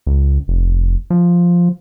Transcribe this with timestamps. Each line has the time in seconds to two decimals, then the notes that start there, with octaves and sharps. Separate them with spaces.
0.07 C#2
0.48 F1
1.10 F3